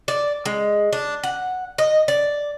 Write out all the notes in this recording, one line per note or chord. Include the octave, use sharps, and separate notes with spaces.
D5
G#3
D4
F#5
D#5
D5